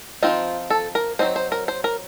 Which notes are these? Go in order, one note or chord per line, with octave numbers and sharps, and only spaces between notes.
F3 C4 D#4 F4
A4
A#4
F#3 A3 C4 D#4 C5
C5
A#4
C5
A#4